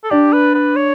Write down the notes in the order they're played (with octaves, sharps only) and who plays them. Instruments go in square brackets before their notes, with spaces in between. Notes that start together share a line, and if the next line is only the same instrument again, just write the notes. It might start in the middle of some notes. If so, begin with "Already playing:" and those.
[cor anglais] A4
[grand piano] D4 [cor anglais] G4
[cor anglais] B4
B4
C#5